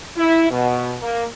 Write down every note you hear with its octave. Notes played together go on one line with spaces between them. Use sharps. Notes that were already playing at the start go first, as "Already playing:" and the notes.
E4
B2
A#3